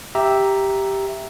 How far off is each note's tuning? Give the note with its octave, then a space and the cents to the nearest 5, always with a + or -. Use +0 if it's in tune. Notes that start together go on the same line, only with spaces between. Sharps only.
G4 +0 E5 +0 A#5 +0